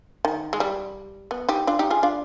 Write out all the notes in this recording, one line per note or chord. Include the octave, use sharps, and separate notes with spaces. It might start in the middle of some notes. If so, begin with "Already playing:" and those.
D#3
G#3
G3
B3
D#4 G4
D4 F4
D#4 G4
F4 G#4
D4 F4